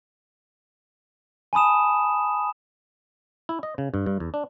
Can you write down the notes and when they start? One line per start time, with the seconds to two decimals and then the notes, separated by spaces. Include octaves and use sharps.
1.53 G#5 A5 B5 D#6 E7
3.49 E4
3.63 D#5
3.78 C#3
3.94 G2
4.06 G2
4.20 E2
4.34 D4